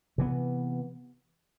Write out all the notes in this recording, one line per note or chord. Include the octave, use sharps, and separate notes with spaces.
C3 E3 B3